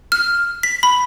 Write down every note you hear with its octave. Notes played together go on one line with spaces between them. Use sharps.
F6
B6
B5